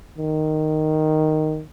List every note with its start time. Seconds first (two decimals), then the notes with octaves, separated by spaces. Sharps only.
0.18 D#3